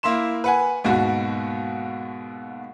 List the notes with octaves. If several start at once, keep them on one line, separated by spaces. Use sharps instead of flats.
A#3 E4 E5 C6 E7
B4 F#5 G#5
D#2 G#2 B2 F#4